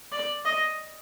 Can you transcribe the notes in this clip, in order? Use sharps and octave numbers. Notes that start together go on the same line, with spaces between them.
D5
D#5